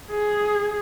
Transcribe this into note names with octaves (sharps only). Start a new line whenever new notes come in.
G#4